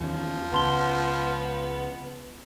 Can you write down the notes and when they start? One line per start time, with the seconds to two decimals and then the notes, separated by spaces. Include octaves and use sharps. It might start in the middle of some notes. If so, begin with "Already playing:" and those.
0.01 E2 D#3 F3 C#4
0.52 C#2 C#3 B3 A5 C6 G7